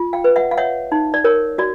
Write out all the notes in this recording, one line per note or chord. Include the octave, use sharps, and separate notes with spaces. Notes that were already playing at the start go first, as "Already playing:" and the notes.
Already playing: F4
F5 G5
B4
E5 F#5
F5
C#5 E5 F#5
D#4
D5
A#4 C#5
F#4 D5